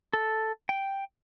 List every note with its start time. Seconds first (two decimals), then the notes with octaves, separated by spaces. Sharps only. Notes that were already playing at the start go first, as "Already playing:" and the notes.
0.13 A4
0.69 G5